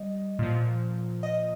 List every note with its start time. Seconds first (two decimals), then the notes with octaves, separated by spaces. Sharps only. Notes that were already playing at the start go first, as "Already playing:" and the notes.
Already playing: G3 D#5
0.39 A#2 F3
1.23 D#5